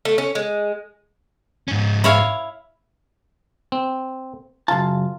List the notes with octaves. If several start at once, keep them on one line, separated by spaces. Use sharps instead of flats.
A3
C#4
G#3
G#2 C#4
E4 C#5 F5
C4
F#2 C#3 F4 A5